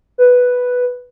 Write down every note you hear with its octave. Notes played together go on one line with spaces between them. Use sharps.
B4